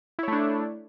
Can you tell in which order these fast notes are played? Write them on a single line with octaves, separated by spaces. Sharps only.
E4 C#5 A3 D4